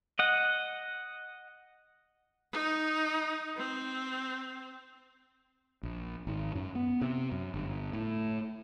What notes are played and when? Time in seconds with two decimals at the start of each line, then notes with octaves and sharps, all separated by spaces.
0.19 D#5 F#5
2.52 D#4
3.57 C4
5.83 A#1
6.27 G#1
6.55 F#2
6.75 B3
7.01 C3
7.32 F#2
7.54 G1
7.93 A2